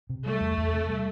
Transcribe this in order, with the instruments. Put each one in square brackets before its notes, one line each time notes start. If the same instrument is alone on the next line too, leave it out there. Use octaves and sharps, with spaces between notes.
[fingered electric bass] C3
[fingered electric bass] G3 [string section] A3
[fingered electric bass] E2
E2
C3
G3